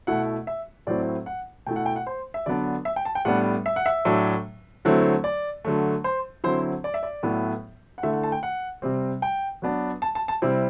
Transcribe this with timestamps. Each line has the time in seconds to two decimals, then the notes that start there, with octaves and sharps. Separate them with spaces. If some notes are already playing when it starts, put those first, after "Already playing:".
0.07 B2 A3 E4 F#5
0.47 E5
0.87 A2 F#3 C4 E4 D5
1.26 F#5
1.66 B2 A3 E4 G5
1.76 F#5
1.86 G5
1.96 F#5
2.07 C5
2.34 E5
2.46 D3 F#3 B3 D4 D5
2.85 E5
2.96 G5
3.05 A5
3.15 G5
3.25 A2 G3 B3 D4 F#5
3.66 E5
3.76 F#5
3.86 E5
4.05 A2 F#3 A3 D4
4.85 D3 F#3 A3 C4 E4
5.24 D5
5.65 D3 F#3 A3
6.04 C5
6.44 D3 F#3 C4 E4 C5
6.84 D5
6.94 E5
7.03 D5
7.23 A2 F#3 B3 E4
7.98 F#5
8.03 D3 A3 E4 E5
8.13 F#5
8.23 A5
8.32 G5
8.43 F#5
8.82 C3 G3 C4
9.22 G5
9.62 F#3 B3 D4
10.02 A5
10.15 A5
10.28 A5
10.42 C3 G3 C4 E4